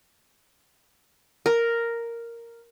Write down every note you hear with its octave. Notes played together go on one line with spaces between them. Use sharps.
A#4